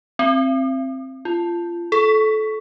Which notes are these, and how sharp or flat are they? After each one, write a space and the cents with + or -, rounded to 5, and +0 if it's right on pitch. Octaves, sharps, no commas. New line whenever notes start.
C4 +15
F4 -25
A4 -20